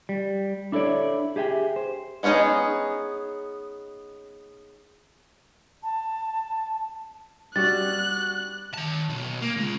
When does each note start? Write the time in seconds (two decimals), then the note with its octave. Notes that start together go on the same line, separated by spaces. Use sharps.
0.09 G3
0.72 D4 E4 A4 C#5 D5
1.36 G4 G#4 E5 G5
1.76 C5
2.23 G#3 B3 C#4 D#4 G#4
5.83 A5
7.56 G3 F#4 F#6 A6
8.74 D#3 A5
9.09 B1 B2
9.42 A#3
9.57 C#3 G#3